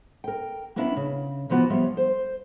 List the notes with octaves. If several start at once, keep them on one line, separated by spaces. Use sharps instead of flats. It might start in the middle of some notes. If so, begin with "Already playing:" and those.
A#4 G5
A#3 B3 C#4 D4 E4
C#3
C3 E3 F3 B3 F#4
F3 G3 B3 C#5 E5
C5